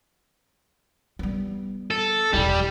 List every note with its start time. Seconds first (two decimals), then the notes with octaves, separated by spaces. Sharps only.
1.19 G3 B3
1.91 A4
2.34 E1 G3 E4